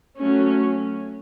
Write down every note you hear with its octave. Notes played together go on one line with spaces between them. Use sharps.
F#3 A3 C#4